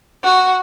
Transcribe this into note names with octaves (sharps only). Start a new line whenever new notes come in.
F#4